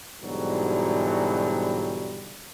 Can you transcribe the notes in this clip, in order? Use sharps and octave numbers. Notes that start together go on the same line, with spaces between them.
G#2 B2 D3 E3 F#3 G3